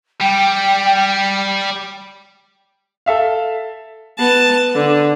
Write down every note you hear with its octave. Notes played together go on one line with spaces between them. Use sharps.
G3 G5
A4 E5 F5
B3 A5
D3